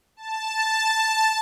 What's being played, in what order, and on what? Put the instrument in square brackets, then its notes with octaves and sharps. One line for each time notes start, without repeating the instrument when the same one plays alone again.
[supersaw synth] A5